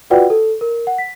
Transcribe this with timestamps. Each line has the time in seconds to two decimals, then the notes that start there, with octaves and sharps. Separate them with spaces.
0.10 F4 F#4 B4 D5 F#5 G5
0.30 A4
0.61 A#4
0.87 F#5
0.98 B6